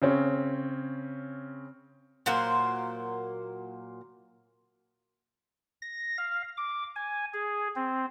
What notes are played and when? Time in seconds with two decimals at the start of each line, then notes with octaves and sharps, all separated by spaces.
0.02 C#3 C4 C#4
2.26 A#2 F#3 A#3 C5
5.82 A#6
6.18 F5
6.57 D6
6.96 G#5
7.33 G#4
7.75 C4